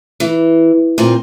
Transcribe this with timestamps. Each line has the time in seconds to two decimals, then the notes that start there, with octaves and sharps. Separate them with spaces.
0.20 E3
0.98 A#2 C4